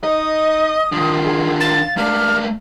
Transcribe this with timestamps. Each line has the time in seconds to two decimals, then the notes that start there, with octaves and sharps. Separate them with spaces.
0.04 D#4 D#5 D#6
0.92 D3 D#3 F4
1.24 G#4
1.61 F5 A6
1.97 A3 A#3 D4 F6